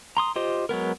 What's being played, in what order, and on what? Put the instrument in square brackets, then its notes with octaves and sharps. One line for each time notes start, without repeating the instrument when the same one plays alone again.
[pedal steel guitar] A#5 C6 D#6
F4 G4 C5 D#5
F#3 G#3 B3 A#4